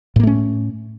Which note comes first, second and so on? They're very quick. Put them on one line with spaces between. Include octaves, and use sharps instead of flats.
A2 A#3 A3 C#4